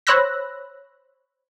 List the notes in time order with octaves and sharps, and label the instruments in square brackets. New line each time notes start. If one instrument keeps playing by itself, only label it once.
[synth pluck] C5 C#5 B5 E6 F#6 A#6